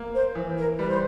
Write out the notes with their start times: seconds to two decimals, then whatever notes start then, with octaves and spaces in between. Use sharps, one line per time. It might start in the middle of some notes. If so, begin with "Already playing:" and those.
Already playing: A#3
0.14 C5
0.35 E3
0.57 A#4
0.79 G3 B4
0.88 C5